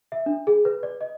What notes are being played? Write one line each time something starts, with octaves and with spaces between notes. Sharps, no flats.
E5
D4
G#4
B4
D5
D#5